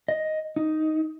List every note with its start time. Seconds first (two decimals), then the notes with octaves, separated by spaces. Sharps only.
0.08 D#5
0.56 D#4